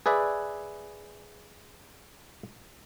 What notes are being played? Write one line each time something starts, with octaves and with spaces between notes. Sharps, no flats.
G#4 B4 D5 E5